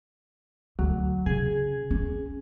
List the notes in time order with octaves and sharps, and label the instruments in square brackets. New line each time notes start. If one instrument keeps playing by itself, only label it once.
[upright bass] D2 [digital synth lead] F#3
[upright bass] C#3 [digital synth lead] G#4
[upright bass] C#4